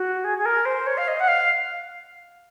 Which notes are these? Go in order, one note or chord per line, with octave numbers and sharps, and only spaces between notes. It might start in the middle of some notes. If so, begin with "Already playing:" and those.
Already playing: F#4
G#4
G#4
A#4
C5
C#5
F5
D#5
F#5
F5